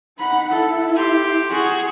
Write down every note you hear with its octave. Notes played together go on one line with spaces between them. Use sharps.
D#4 F#5 B5
E4 A4
G4 C6
F#4 G#4